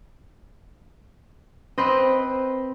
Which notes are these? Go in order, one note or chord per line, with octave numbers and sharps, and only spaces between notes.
C4 B4 C5 D#5